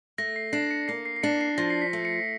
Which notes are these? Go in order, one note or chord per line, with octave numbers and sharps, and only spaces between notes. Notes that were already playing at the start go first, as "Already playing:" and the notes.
A3 A#6
C7
D4 C7
C#7
A#3 C7
C7
C7
D4 C#7
C7
F3 A#6
C7
B6
A3
C#7